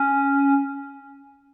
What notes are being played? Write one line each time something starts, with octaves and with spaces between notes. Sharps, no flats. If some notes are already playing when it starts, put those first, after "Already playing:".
Already playing: C#4